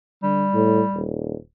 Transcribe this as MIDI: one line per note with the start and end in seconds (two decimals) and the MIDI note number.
0.23 0.44 50
0.23 1.06 55
0.54 0.81 45
0.94 1.35 27